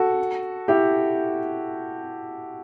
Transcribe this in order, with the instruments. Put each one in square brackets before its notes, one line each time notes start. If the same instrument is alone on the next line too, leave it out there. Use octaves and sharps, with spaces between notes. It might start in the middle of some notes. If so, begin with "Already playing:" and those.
Already playing: [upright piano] F#4 A4
E4 G4